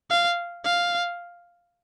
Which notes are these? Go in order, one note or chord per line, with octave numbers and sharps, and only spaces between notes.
F5
F5